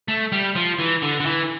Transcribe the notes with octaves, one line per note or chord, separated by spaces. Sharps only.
A3
G3
F3
E3
D3
D3
E3